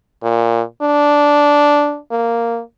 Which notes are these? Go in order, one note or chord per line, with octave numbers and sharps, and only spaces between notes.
A#2
D4
A#3